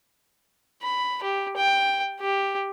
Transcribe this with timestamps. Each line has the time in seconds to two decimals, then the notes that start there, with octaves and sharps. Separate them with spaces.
0.83 B5
1.23 G4
1.57 G5
2.20 G4